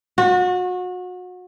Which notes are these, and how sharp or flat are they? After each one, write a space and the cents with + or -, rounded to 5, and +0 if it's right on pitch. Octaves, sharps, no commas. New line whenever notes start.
F#4 -30